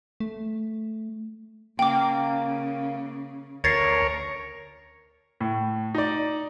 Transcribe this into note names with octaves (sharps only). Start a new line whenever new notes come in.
A3
C#3 A#3 G5 D6
D2 A#4 C#5 G#6 A6 C7
A2
D#4 D5